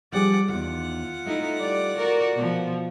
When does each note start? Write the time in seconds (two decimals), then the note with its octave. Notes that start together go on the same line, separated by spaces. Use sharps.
0.12 F3 G3 G#4 D5 F#5
0.49 E2 D#3 F4 F#5
1.26 A3 D#4 E4
1.58 G3 D5
1.97 F#4 A#4 D5
2.36 B2 F3